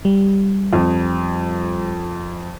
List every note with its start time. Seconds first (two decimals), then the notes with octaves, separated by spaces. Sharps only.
0.05 G3
0.73 F2